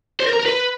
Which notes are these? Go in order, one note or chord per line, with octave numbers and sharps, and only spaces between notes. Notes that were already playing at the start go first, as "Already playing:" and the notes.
C5
A#4
A#5
A#4
B4